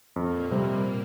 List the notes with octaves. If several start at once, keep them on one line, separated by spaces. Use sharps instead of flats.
F2 A#2 A#3
C3 G3 C4